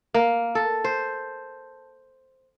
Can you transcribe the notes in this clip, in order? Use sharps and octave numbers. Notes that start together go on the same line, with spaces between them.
A#3
A4
C5